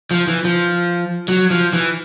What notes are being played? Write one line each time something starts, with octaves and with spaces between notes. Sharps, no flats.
F3
E3
F3
F#3
F3
E3